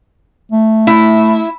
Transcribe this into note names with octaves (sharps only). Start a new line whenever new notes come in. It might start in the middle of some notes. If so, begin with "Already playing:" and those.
A3
E4